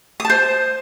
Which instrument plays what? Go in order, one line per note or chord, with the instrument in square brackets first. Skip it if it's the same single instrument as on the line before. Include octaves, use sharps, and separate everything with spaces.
[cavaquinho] D#6
A5
C5